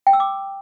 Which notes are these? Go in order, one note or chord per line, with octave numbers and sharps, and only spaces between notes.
G5
E6
D6